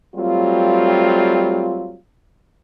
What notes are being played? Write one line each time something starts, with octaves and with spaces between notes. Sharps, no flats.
F#3 G3 A3 C4 F4